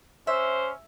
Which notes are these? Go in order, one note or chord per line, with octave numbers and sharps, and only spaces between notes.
C#4 C5 E5